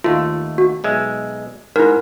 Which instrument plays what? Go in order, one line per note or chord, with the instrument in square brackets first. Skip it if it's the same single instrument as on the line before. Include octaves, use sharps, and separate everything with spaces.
[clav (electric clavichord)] D#2 A3 [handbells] F4
[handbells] F#4
[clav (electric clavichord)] B1 G#3 E5
[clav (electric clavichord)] G#2 [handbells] E4 A#4